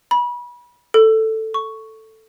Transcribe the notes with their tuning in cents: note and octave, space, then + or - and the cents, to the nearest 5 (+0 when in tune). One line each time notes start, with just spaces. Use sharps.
B5 -30
A4 +5
C#6 +5